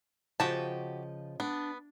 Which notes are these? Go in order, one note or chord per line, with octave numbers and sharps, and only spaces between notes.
C#3 F3 F#4 G4 D#5 A5
B3 D4